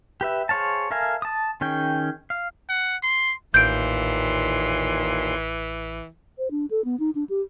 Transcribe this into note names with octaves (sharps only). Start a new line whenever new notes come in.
G4 B4 E5
G#4 C5 C#5 F5 A5
A4 A#4 E5 F5 G#5
A5 D#6
D#3 C#4 G#4 G5
F5
F#5
C6
A1 D#2 A#2 E3 C6 G6 D7
C5
D4
A4
B3
D#4
D4
G4